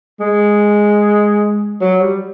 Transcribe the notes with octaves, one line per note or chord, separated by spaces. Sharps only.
G#3
F#3
G3